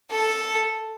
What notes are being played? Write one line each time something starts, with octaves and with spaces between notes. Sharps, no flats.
A4